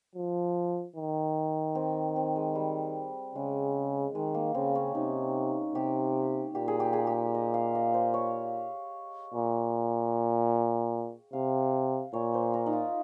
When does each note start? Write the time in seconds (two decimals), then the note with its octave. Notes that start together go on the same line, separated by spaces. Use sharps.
0.15 F3
0.96 D#3
1.75 C4
2.16 C4
2.36 G#3
2.55 G3
3.35 C#3 G#3
4.15 D#3 G#3
4.34 A#3
4.54 C#3 C4
4.75 C#4
4.95 C3 D#4
5.75 C3 G4
6.55 A#2 G4
6.68 G#4
6.80 G4
6.93 G#4
7.07 G4
7.34 D#5
7.54 F5
7.75 D#5
7.94 C5
8.14 C#5
9.34 A#2
11.33 C3 F5
12.13 A#2 C#5
12.34 C5
12.53 A#4
12.66 D#4
12.73 F4